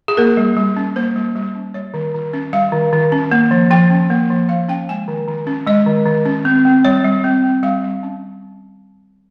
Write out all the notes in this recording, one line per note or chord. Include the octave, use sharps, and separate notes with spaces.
G#4
A#3 A#4
G3
G3
C#4
A#3 C5
G3
G3
C#4
G3 C#5
D#3
D#3
C#4
G3 F5
D#3
D#3
C#4
A#3
F3
F3 G5
C#4
A#3
F3
F3 F5
C#4 G5
G#3 G#5
D#3
D#3
C#4
G#3 D#5
D#3
D#3
C#4
C4
C4
G3 C#5
G3
C4
C4
G3 F5
G3
C#4